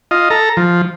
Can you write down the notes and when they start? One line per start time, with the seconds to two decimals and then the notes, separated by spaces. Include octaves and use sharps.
0.11 F4 D#5
0.30 A4 A#5
0.57 F3